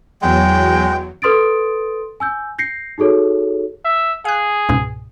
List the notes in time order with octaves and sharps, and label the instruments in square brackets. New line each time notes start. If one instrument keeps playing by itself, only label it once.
[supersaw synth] E2 F#3 [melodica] G#3 [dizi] G5
[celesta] A4 B4 C6 D#6 A6 D7
G#5 E6 G6
G6 A#6 C7 C#7
D#4 F#4 G#4 A4 C#5
[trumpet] E5
[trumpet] G#4 [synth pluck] F5 F#6
[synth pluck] C#2 G#2 B2